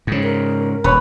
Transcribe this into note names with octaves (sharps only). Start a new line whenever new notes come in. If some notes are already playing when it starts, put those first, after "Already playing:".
G#2 C#3
A#4
D#1 B4 C#5